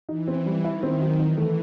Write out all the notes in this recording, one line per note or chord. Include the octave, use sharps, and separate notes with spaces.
E3 D#4
C4
G3
D#3 E4
C4
F#3
E3 D#4
A3